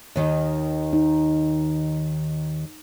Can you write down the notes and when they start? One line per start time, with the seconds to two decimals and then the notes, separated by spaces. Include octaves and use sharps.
0.16 D#2 D#3
0.93 D#4